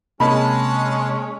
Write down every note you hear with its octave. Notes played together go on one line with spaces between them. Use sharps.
C3 G#3 A#3 C#4 D#5 A5 B5